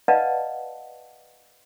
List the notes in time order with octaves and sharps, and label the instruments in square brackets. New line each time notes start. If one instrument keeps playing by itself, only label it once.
[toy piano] B4 D5 D#5 F5 F#5 A5